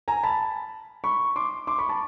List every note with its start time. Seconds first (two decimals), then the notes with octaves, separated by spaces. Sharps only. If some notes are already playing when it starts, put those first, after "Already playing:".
0.08 G#5 A#5
0.23 A5 B5
1.04 B5 C#6
1.36 C6 D6
1.67 C6 D6
1.78 B5 C#6
1.89 A5 B5